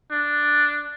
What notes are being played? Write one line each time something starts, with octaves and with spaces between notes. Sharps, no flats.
D4